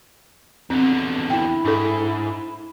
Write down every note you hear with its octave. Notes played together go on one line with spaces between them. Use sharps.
E2 D3 C4
E4 G5
G#2 D4 A4